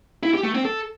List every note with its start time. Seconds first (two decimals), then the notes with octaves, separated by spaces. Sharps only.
0.23 E4
0.34 G4
0.43 A3
0.55 C4
0.65 A4